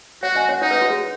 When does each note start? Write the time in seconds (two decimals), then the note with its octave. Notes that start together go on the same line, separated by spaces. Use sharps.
0.23 F#4 C#5 F#5
0.35 D#5 G#5
0.49 C#5 F#5
0.62 D#4 C#5 F#5
0.71 B4 D#5
0.81 F#4
0.90 G#4